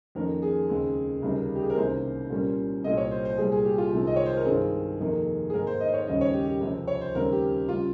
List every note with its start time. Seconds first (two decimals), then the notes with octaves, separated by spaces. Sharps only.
0.15 F2 D#3 A#3 C#4 A#4
0.42 G#4
0.69 D#2 C#3 G#3 C4
1.22 C#2 C3 D#3 G3 C#4
1.55 G4
1.62 G#4
1.70 A#4
1.76 C2 C3 D#3 A#3 C#4 C5
2.30 A#2 G3 A#3 C#4
2.84 C2 A#2 G3 C4 D#5
2.97 C#5
3.11 C5
3.25 C5
3.38 C2 A#2 G3 G#4
3.52 G#4
3.65 G4
3.78 F4
3.93 C2 C3 D#3 G#3 C4
4.07 D#5
4.16 C#5
4.26 C5
4.36 A#4
4.45 G2 D#3 G#3 C4 G#4
5.00 F2 C3 D#3 A#3
5.50 G#4
5.53 G#2 D#3 A#3 A#4
5.67 C5
5.80 D#5
5.88 C5
5.94 C#5
6.07 D#2 C#3 G3 C#4 D#5
6.21 C#5
6.34 G4
6.47 G4
6.61 C#2 C3 F3 C4
6.88 C#5
7.01 C5
7.15 D#2 C#3 G3 C4 A#4
7.32 G4
7.69 C#3 G3 F4